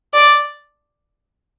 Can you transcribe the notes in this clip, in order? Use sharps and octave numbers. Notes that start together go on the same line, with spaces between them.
D5